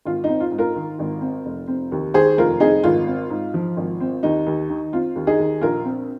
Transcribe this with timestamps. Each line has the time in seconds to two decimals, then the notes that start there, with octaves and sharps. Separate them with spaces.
0.05 G#1 F4
0.24 C4 D#4
0.40 F4
0.52 G#2
0.58 F4 A#4
0.76 D#3
0.99 G#1
1.21 C4
1.45 F1
1.67 C4
1.92 D#2
2.14 D#3 G#4 C5
2.38 F1 F4 A#4
2.60 C4 D#4 G#4
2.84 G#1 F4
3.07 C4
3.30 G#2
3.54 F3
3.77 G#1
4.00 C4
4.23 D#2 D#4
4.47 D#2
4.69 D#3
4.93 C4 F4
5.16 D#2
5.27 D#4 G#4
5.39 D#2
5.61 A#1 F4 A#4
5.85 C4